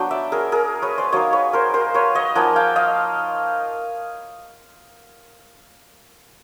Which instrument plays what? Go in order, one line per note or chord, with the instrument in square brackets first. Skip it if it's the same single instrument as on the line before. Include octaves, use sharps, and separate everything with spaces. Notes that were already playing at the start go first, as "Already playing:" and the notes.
Already playing: [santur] F#3 B3 D4 G5
D5 E5
G#4 A#4
G#4 A#4
B4 C#5
C5 D5
F#3 A#3 D#4 C#5 D#5
B4 C#5
A#4 C5
A#4 C5
B4 C#5
C#5 D#5
F3 A#3 D#4 F#5 G#5
F5 G5
D#5 F5